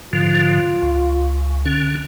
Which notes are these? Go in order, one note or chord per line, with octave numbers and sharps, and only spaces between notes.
G#2 D3 F3 F4
C#2
D3 C#4